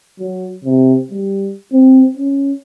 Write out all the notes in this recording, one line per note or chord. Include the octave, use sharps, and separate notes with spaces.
F#3
C3
G3
C4
C#4